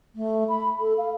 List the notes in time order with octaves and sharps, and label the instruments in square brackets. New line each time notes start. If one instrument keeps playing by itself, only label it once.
[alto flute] A3
B5
A4
F5